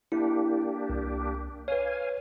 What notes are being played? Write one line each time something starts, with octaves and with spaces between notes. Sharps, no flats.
A#3 D4 E4 G4
C2
B4 C#5 F5 G#5